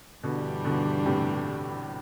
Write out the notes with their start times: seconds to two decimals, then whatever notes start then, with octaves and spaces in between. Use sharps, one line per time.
0.23 G2 B2 D3 E3 G3 D4
0.65 B2 D3
1.06 A2 C3